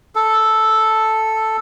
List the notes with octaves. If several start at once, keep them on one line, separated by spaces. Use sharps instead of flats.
A4